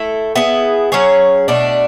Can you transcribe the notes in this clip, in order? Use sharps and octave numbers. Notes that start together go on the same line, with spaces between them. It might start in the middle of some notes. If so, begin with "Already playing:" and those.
Already playing: A3 E4 A4
B3 E4 G#4
F#3 C#4 G#4 C#5
B2 A3 D4